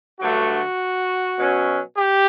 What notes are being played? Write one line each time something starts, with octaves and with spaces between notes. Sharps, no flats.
G2 D3 F#3 A3 F#4
B2 F#3 C#4
G4